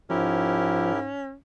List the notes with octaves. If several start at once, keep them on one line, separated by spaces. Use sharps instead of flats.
G#2 F3 C#4 E4 G4 A#4